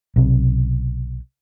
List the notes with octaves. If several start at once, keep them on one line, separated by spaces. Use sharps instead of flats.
B1 C3